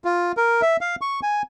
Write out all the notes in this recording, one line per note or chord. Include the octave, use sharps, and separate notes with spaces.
F4
A#4
E5
F5
C#6
G#5